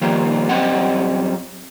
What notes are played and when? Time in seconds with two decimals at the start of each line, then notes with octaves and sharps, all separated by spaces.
0.01 D#3 F3 G3 A#3
0.49 F#2 G3 C4 D#5 F#5